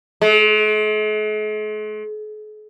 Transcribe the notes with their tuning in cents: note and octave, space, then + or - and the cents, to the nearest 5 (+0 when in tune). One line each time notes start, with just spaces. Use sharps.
G#3 +45